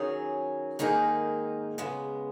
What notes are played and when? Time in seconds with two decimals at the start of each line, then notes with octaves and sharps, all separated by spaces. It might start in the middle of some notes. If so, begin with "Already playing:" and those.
Already playing: D#3 F#3 C#4 G#4
0.79 G#2 D#3 A#3 D#4 G#4
1.78 C#3 G#3 B3